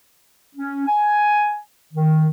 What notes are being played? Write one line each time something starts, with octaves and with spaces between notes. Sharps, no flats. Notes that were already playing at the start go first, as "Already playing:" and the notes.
C#4
G#5
D#3